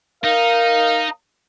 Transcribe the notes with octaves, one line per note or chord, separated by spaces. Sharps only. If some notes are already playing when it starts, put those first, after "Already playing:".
D#4 A#4 F5